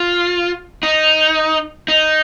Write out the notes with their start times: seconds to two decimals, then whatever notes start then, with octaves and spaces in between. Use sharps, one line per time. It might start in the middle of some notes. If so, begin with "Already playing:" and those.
Already playing: F4
0.83 D#4
1.88 D#4